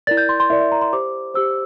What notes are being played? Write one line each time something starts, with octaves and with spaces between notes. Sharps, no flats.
E4 A#4 D5 A6
G6
C6
C6
E4 A#4 D5 E5
E5
A#5
C6
G4 C5 D6
G4 C5 E6